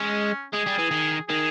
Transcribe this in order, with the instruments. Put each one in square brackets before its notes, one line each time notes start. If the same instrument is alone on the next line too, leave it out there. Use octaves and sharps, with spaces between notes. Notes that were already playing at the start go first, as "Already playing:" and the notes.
Already playing: [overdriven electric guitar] G#3 [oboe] C#4
[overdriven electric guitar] G#3 [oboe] G#4
[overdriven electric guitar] G3
E3
D#3
[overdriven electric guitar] D#3 [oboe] G#4